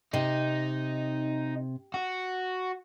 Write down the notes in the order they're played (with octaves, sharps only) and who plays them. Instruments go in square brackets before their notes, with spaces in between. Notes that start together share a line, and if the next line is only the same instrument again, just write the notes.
[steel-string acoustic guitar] C3 [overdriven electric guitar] D#4
[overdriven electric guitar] F#4